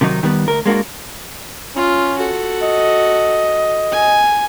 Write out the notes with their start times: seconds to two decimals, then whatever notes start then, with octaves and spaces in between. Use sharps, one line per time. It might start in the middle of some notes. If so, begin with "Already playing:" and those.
0.01 C3 D#3 F#3 D#4
0.23 D#3 G3 B3
0.48 D2 A#4
0.66 G#3 A#3 D4 F#4
1.76 C#4 F4
2.18 F#4 A4
2.63 D#5
3.92 G#5